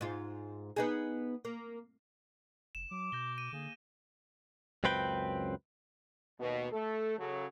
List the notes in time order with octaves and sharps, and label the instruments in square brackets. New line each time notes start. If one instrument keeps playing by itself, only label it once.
[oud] G#2 F4
B3 D#4 G#4
A#3
[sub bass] F1 [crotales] E7
[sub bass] F#3 [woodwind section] D6
[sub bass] B2 [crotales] G6 A#6 G7
[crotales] D#7
[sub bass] D3 [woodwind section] A#3 G#4
[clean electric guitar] C#2 F#2 C4 B4 G5
[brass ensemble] D#2 B2
A3 A4
C#3 F#3 A4